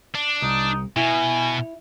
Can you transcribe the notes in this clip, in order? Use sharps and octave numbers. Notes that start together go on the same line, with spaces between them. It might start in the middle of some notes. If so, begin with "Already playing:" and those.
D4
C2 D#4
B2 E4 G#5